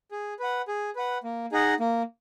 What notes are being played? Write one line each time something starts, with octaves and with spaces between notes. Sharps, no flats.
G#4
B4 F#5
G#4
B4 F#5
A#3
D#4 G#4 D#5 F#5
A#3